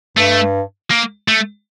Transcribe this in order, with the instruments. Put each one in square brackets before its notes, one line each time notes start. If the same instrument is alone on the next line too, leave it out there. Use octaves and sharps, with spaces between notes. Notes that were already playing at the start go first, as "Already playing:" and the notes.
[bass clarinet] G2 [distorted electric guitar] A3
[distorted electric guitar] A#3
A3